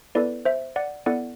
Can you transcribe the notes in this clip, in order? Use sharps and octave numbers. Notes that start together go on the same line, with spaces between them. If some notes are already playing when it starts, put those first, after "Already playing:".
B3 E4 A4 B4 D5
C5 E5
D5 F#5
B3 E4 A4 D5 F#5